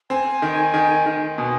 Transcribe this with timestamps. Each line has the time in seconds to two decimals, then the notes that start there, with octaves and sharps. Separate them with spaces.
0.10 C4 G#5
0.42 D#3
0.74 D#3
1.06 D#3
1.38 B2 G#5